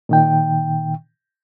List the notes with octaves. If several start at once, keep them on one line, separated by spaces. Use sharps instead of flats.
A#2 D#3 G5